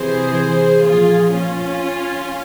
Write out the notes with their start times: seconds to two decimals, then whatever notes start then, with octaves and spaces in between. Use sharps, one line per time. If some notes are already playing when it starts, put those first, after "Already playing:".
Already playing: C3 E3 G#4 C5
0.84 A#2 F3 F4 G#4
1.31 C#4 F4